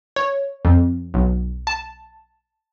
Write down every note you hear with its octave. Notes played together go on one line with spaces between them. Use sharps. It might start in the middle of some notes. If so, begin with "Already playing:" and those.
C#5
F2
B1
A5